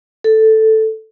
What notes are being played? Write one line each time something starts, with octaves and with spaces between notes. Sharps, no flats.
A4